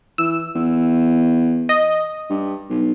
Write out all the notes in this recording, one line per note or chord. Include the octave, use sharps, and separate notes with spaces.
E3 E6
E2
D#5
G2
B1